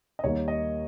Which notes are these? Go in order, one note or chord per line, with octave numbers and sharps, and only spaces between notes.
D#5
D#2 D#3 G3 A#3 C#5
D#5